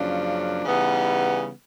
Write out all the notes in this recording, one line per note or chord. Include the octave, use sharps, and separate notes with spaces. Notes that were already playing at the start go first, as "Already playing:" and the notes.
Already playing: F#2 C#3 F3 A#3 D4
C#3 E3 G3 B3 D#4